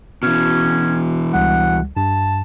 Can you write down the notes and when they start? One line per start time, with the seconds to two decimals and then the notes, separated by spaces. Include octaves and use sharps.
0.23 B2 E3 C#4 F#4
1.33 C#2 G3 F#5
1.97 G2 A5